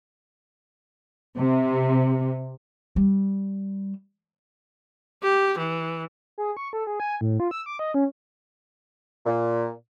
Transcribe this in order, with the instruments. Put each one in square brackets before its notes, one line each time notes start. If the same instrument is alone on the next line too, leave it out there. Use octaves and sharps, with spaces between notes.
[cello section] C3
[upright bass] G3
[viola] G4
E3
[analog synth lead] G#4
C#6
A4
G#4
G#5
A2
F4
E6
D6
D#5
C#4
[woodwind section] A#2